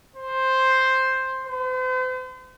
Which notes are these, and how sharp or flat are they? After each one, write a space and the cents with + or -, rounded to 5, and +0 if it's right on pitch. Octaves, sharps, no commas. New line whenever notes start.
C5 +5
C5 -40